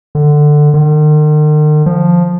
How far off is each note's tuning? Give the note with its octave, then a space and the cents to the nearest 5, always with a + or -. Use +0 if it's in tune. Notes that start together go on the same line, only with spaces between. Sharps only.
D3 +15
D#3 -45
F3 +5